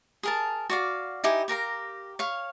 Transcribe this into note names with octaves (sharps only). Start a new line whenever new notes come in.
G#4 A#4 A5
F#4 D5 F5
D#4 E4 G4 G#5
G4 A#4 F5 A#5
C#5 F5